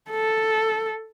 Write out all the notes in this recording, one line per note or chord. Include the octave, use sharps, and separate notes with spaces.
A4